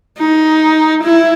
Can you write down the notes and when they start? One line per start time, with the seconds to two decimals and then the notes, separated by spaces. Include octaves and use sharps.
0.18 D#4
1.04 E4